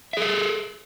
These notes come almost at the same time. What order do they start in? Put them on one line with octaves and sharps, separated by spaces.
E5 G#4 A4